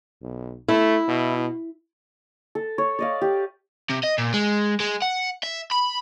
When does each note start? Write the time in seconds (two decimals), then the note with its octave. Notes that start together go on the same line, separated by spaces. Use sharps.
0.22 B1
0.68 A3 E4
1.08 B2
2.55 A4
2.78 C#5
2.99 D5 D#5 F5
3.21 G4
3.90 C3
4.04 D#5
4.18 A#2
4.34 G#3
4.80 G#3
5.02 F#5
5.44 E5
5.71 B5